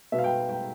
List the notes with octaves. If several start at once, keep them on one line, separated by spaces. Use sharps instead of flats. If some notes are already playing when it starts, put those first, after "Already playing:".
B2 B3 E5
F5
G5
G5